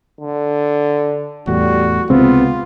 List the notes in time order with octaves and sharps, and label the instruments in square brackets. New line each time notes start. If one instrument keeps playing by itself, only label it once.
[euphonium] D3
[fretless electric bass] E2 A2 [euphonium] G3 [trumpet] F#4
[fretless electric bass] C#2 C3 G#3 [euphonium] B3 [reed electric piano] C4 [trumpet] F4